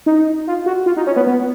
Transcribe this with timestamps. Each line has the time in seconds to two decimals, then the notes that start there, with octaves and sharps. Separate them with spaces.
0.06 D#4
0.47 F4
0.66 F#4
0.86 F4
0.97 D#4
1.07 C#4
1.16 B3
1.26 B3